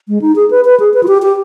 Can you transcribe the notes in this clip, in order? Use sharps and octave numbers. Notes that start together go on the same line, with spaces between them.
G#3
D#4
G#4
B4
B4
G#4
B4
F4
G4
G4